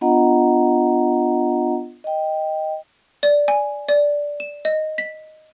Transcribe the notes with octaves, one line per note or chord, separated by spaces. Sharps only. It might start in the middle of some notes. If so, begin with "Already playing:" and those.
B3 D4 F4 D#5 F#5 A#5
D#5 G5
D5
G#5
D5
E7
D#5
B6